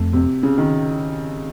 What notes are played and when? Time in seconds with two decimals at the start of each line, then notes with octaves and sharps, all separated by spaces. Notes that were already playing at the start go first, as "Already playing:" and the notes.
Already playing: F2 A3
0.13 C3
0.43 C#3
0.58 D#3